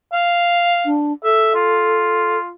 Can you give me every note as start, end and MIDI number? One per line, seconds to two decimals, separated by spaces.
0.13 0.92 77
0.85 1.12 62
1.24 2.38 69
1.24 1.52 76
1.55 2.54 65